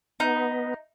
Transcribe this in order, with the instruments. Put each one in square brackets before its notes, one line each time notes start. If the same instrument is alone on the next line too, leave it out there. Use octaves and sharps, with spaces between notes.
[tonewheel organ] B3 [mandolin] D#4